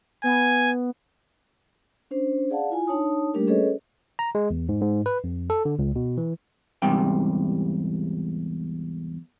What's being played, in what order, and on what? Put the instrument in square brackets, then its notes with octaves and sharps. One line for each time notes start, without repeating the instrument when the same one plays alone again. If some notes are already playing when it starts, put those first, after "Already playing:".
[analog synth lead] B3 [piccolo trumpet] G#5
[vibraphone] C#4 D4 C5
G#4 D5 F5 F#5 A5
E4 F4 G#5
D4 D#4 C#5 A5 D#6
G3 A3 A#3 D4 G4 A#4
C#4 G#4 A4 B4 C#5 D#5
[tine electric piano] A#5
G#3
E2
G#2
G#2
B4
F2
A4
D3
C#2
B2
E3
[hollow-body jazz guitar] E2 G#2 C3 G3 G5